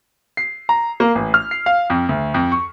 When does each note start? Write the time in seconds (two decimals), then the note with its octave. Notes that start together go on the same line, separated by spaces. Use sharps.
0.37 C7
0.69 A#5
1.00 A#3
1.15 A1
1.34 F6
1.51 C7
1.66 F5
1.90 F2
2.09 D2
2.34 F2
2.52 C#6